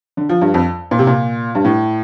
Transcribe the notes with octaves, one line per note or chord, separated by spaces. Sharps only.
D3
F3
G2
F2
A#2
C3
A#2
G2
A2